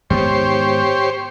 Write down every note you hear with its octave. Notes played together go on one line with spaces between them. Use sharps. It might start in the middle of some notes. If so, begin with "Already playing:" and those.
G#2 D#3 B3 G4 C5 C#5